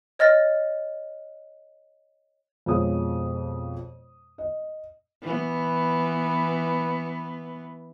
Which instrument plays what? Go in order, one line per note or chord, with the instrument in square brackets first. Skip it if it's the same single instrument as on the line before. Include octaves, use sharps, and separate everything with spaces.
[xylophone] C#5 D#5 F6 A6 A#6
[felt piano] F2 B2 G#3 F4 C#5 D#6
D#5
[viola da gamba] E3 B3